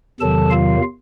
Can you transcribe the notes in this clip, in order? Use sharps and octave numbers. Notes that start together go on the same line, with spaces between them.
E2 C3 D#3 F#3 A4 A5
F4 F5